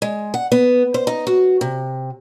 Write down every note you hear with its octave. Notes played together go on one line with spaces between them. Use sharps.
G#3
F#5
B3
C5
D#4
F#4
C3